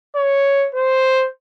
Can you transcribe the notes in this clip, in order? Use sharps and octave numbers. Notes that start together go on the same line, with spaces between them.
C#5
C5